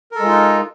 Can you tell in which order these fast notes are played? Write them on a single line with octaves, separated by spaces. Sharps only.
A#4 A4 G#3 F4 D#4